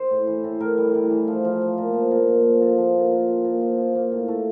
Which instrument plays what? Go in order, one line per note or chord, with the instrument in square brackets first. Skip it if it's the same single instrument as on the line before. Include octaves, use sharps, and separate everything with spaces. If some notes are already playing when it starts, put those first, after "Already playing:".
Already playing: [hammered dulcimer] C5
A2
E3
A2
A2 A#4
G3
A2
E3
F3
F3
F3
A#2
F3
A#2
A#2
F3
F3 A4
F3
A#2
A#2
F3
A#2
F3
F3
F3 A#3
A2
A2 A3